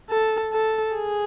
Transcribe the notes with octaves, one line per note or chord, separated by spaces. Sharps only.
A4
A4
G#4